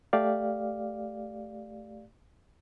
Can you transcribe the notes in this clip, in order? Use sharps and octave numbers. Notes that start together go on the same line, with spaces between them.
A3 G4 D5 F5